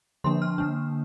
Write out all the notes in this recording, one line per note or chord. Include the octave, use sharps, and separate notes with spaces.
D3 F3 A#3 D4 C6
F6
D3 A#3 D4